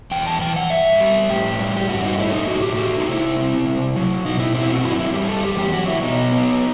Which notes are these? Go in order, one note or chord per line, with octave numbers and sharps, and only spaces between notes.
E2 G5
A5
E3 G5
F#5
G2 E5
G3
A2 G4
G3
G4
G2 F#4
D#4
A3 E4
D#4
A2 F#4
G4
A3 F#4
D#4
C3 E4
C4
C3
F#3
B2 D#4
E4
C4 E4
F#4
F#2 E4
D#4
E4
G3 G4
A4
E2 G4
G4
F#3 F#4
E4
B2 D#4
B3